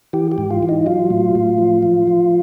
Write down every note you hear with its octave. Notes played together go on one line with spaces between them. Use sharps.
E3 G4
G4
G#2
F4
E3
D#4
F#3 F4
A2
A2
F3
F3
F3